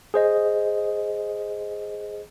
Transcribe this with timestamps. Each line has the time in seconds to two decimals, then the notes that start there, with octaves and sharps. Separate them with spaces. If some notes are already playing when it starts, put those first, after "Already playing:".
0.14 G#4 C5 D#5